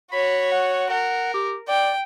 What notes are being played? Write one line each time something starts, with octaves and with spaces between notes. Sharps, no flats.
F#4 C#5 B5
F#5
A#4 F#5
G4
D5 G5